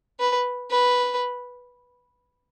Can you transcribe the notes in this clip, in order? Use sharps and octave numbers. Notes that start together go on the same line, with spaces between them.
B4
B4